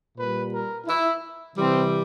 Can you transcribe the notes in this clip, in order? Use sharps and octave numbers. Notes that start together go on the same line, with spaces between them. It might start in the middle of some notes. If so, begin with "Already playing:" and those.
A#2 G3 B4
A#4
E4
C3 E3 G3 C4